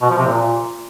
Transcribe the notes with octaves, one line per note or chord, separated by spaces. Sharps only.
B2
F3
C3
A#2